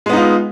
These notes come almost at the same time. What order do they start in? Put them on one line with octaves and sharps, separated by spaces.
G#3 B3 D#4 F4